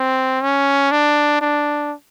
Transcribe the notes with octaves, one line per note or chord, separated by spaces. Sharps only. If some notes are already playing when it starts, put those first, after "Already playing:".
Already playing: C4
C#4
D4
D4